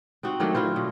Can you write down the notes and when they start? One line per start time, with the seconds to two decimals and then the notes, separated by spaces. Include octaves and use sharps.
0.23 C4 D#4 F#4
0.40 D#3 F#3 A3 D4
0.55 F#3 E4 F4 C5
0.76 B2